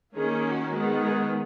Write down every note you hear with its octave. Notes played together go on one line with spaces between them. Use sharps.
D#3 A#3 C#4 G#4
F#4
D#3 G#3 B3
G#4